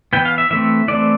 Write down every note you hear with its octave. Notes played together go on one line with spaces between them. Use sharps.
E3 B3 G5
F5
E5
E3 A3 C4 E5
E3 A3 C4 D5